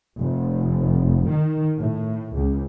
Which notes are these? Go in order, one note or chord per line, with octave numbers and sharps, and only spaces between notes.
F1
D#3
A2
C#2